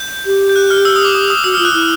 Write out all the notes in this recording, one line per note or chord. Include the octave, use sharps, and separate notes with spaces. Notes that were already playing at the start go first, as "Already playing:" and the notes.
Already playing: G6
G4
G6
F#6
F6
E6
D#6
D6
D#6
D#6
F#4 E6
F6
F4
F#6
E4